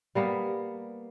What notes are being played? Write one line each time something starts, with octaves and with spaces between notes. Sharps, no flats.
G3 A#3 B3